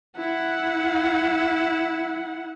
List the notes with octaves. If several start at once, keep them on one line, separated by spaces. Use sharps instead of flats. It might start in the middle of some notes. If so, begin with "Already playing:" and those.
E4 F#5